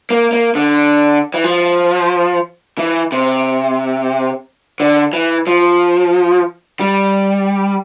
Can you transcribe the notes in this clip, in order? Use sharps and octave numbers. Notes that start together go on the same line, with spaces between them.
A#3
A#3
D3
E3
F3
E3
C3
D3
E3
F3
G3